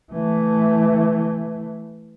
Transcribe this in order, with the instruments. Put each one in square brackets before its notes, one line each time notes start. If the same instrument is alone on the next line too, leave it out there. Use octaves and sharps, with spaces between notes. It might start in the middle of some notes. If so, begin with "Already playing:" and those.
[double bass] E3 A3